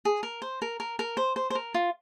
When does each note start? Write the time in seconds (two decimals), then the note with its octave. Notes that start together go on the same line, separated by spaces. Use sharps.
0.05 G#4
0.23 A#4
0.42 C5
0.62 A#4
0.80 A#4
0.99 A#4
1.17 C5
1.36 C5
1.50 C5
1.55 A#4
1.74 F4